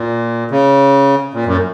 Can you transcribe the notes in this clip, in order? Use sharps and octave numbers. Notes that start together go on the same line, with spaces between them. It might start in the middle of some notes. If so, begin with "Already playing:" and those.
Already playing: A#2
C#3
A#2
F#2